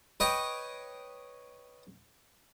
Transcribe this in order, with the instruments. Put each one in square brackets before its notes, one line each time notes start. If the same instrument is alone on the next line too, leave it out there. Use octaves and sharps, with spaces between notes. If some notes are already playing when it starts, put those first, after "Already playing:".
[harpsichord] B4 C#5 D#5 G5